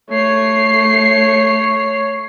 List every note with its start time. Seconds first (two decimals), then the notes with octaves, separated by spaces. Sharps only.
0.10 A3 C#5 C7